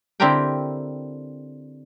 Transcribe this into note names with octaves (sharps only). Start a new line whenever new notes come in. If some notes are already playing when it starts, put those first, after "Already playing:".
D3 C4 E4 G4 A#4 G5